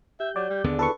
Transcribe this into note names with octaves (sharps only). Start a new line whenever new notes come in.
G4 E5 G6
F#3 D5
G3
D#2 D3 B3 D4 G#4
E4 G#4 A4 B4 C#6